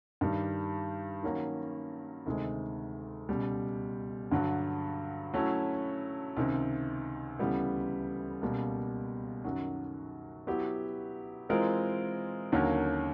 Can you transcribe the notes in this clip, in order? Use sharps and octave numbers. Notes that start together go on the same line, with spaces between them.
G2 D#3 G3
D#3 F#3 A#3 C#4
D2 C3 D#3 G#3
C#2 B2 G3
G2 D3 F#3
F#3 A3 C#4 E4
C#2 C3 D#3
D2 C#3 E3 G3 B3
C#2 B2 G3 A#3
F#2 D#3 F#3
F#3 B3 E4 G4
E3 G#3 C4 F4 A#4
D#2 D3 F#3 A#3 C#4